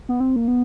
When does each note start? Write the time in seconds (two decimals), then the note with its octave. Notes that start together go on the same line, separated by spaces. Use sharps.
0.09 B3
0.20 C4
0.36 A#3
0.48 B3